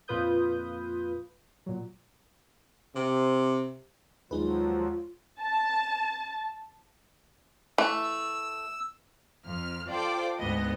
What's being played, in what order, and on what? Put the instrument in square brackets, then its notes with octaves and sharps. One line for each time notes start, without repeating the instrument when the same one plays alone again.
[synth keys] F2 A#2 F4 B4 D#6 G6
A#2 F#3
[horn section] C3
[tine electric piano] D#2 G#3 [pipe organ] F3 F#3 [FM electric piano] D#4 G#4 B4 [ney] F4
[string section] A5
[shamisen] E3 [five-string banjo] A3 [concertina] E6
[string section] F2 F6
F4 A4 C5 D5 G5 D6
D2 G#2 B3 D#5